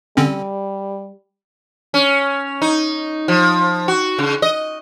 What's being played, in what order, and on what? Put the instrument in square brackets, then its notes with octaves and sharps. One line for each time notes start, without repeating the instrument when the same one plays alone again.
[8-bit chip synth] D3 C4 C#4 [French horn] G3
[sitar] C#4
D#4
F3
F#4
C#3
D#5